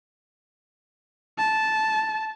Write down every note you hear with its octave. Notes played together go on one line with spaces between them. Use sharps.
A5